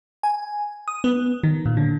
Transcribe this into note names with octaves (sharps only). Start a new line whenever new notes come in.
G#5
D#6
B3
D#3
A#2
D3